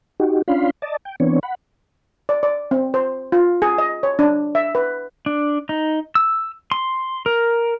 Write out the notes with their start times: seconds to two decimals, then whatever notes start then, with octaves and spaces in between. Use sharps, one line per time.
0.20 D#4 F#4 G4
0.48 C#4 D4 F4 F5 B5 C6
0.82 D5 D#5 A5
1.05 G5
1.20 E3 B3 C4 D4 C#5
1.43 F#5 B5
2.29 D5
2.43 D5
2.71 C4
2.94 C5
3.32 F4
3.62 G#4
3.78 D#5
4.03 C#5
4.19 D4
4.55 E5
4.75 B4
5.26 D4
5.69 D#4
6.15 E6
6.72 C6
7.26 A#4